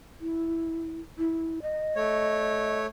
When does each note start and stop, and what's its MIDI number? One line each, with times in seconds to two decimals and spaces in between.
0.20 1.00 64
1.18 1.59 64
1.62 2.78 75
1.96 2.86 57
1.96 2.86 73